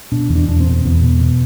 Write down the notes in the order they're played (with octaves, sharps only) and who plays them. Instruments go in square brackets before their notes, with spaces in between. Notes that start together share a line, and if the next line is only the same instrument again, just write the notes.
[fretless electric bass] B2 D4
E2
D4
E2 D4
C4
B2
E2 B3
B2
B2